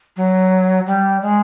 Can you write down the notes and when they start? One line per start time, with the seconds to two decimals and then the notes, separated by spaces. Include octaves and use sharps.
0.17 F#3
0.86 G3
1.22 G#3